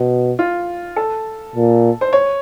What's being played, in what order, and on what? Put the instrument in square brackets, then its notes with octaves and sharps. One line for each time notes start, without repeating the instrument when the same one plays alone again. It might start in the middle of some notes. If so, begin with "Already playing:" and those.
Already playing: [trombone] B2
[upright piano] F4
A4
[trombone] A#2
[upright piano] C5
C#5